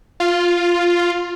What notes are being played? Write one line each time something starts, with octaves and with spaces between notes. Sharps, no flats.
F4